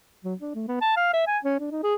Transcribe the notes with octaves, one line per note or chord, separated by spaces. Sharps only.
F#3
D4
A3
B3
A5
F5
E5
G#5
C#4
D4
D#4
G#4